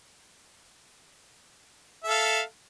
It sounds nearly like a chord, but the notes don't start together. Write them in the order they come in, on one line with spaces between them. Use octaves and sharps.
E5 A4 F5